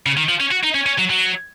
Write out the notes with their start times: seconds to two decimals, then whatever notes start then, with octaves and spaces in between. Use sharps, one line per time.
0.06 C#3
0.17 D#3
0.29 F3
0.40 C#4
0.52 F#4
0.64 D#4
0.75 C#4
0.86 C#4
0.98 F#3
1.10 F#3